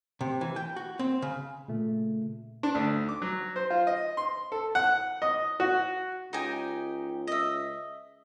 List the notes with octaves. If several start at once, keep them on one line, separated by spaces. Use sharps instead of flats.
C3
E3
G5
F#4
C4
C#3
A#2 C#3 A3
D4
D2
D6
F#3
C5
F4
D#5
C6
A4
F#5
D#5
F#4
C#2 D#4 G4 G#5
D#5 E5